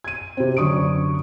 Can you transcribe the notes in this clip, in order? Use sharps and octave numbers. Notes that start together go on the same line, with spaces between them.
G#6 D#7
C3 C4
F#2 D3 C#6 D#6 D7